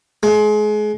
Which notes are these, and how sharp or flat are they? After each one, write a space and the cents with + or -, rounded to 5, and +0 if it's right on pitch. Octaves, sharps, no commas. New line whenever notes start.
G#3 +30